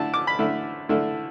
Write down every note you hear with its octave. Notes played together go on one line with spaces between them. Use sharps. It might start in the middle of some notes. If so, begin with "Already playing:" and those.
Already playing: D3 A3 E4 A5
D6
B5
D3 A3 E4
D3 A3 E4